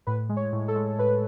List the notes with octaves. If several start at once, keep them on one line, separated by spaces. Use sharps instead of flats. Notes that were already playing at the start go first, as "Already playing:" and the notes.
A2 B4
G#3
C#5
A2
A4
G#3
A2 B4